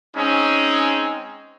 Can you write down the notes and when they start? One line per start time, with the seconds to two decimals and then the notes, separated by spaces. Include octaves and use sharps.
0.16 G#3 C4 C#4 D#4